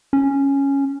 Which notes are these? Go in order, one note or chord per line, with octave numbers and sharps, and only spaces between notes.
C#4